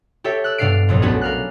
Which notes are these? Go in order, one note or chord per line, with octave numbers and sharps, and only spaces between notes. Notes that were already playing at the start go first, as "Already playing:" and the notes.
G4 A4 C#5 E5
E6 F#6
G2 B2 D4 F5 C7 D7
B1 F2 A#2
A3 B3 C#4 D4 F#4 G#4
A#4 F5 F#6